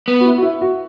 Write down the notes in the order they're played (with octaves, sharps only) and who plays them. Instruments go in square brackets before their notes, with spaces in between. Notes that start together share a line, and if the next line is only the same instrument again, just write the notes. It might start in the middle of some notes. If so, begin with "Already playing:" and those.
[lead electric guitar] B3
[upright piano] F#4
E4
F#4
E4
F#4